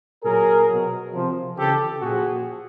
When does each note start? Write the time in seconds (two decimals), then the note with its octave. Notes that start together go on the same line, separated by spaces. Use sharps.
0.23 A#2 F#3 G#4 A#4
0.69 B2 F#3
1.13 C3 F3
1.57 C#3 E3 G4 A4
2.02 A#2 F3 F#4 G#4